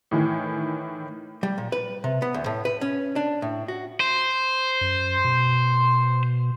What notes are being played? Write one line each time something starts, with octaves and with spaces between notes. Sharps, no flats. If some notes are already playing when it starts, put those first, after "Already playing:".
A2 D#3 E3
G3
A#2
B4
C3
B3
D2
A2
B4
C#4
D4
A2
F#4
C5
F#2
B2